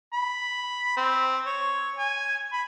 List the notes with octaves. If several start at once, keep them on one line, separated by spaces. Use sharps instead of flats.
B5
C4
C#5
G#5
B5